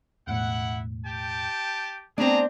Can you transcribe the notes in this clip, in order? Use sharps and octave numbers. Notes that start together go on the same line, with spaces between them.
E1 A2 E4 F#5
G4 G5 A5
A3 B3 C4 D4 G#4 A5 A#5